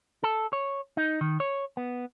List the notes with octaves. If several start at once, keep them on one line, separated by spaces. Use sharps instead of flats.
A4
C#5
D#4
D#3
C#5
B3